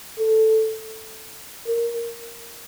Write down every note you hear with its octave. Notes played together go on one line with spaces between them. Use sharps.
A4
A#4